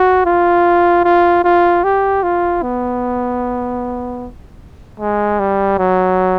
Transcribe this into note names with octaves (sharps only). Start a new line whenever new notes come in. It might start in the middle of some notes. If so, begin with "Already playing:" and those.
Already playing: F#4
F4
F4
F4
G4
F4
B3
G#3
G3
F#3